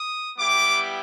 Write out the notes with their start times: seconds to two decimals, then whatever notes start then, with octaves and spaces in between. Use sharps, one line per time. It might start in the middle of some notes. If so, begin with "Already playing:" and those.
Already playing: D#6
0.37 G3 B3 E4 G4 D6